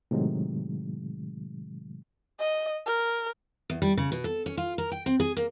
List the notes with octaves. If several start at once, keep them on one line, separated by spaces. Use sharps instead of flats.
A2 C3 D#3 F#3 G#3
D#5
A#4
E2
G3
C#3
B2
A4
C#4
F4
A#4
G5
C4
G#4
A#3